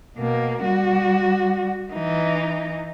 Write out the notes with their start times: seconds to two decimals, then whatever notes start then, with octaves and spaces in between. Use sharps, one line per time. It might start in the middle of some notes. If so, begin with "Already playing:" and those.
0.17 B2 A#3
0.64 G3 F#4
1.93 E3 D#4